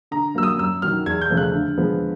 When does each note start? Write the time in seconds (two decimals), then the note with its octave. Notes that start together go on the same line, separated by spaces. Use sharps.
0.11 D3 A#5
0.35 F#3 A#3 E6
0.43 D#6
0.58 F#2 E6
0.82 D#3 F#3 F6
1.06 E2 G#6
1.21 G6
1.30 C#3 F3 A3
1.37 F#6
1.53 D3
1.78 F3 G#3 B3